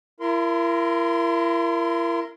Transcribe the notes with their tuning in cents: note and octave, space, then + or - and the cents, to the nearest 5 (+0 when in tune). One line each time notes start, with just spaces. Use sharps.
E4 +40 A#4 +0 C6 -20